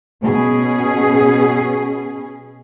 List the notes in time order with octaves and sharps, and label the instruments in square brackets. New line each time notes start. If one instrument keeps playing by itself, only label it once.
[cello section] B2 C#4 G#4